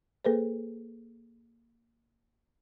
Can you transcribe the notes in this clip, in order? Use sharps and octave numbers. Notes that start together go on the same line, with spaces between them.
A#3 G#4 A4 B4 C5